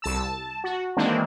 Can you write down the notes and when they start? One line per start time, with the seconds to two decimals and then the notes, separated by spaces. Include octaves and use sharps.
0.02 C2 A5 E6
0.18 A5
0.64 F#4
0.97 D#3 E3 G#3 A#3 C4 D4